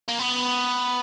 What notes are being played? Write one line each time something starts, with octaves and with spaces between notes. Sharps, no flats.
A#3
B3